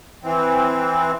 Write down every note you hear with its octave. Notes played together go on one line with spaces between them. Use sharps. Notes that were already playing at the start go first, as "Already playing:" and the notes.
E3 C4